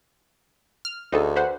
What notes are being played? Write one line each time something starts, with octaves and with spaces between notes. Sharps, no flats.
F6
D2 D#4 G#4 A4
B4 C5 F#5